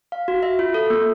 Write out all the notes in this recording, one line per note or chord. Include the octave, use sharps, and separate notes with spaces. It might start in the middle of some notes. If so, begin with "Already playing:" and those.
F5
F#4
E5
F4
A4
A#3